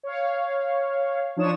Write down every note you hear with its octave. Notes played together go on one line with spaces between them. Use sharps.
C#5 F5
F3 D4 D#4 C#5 D#6 E7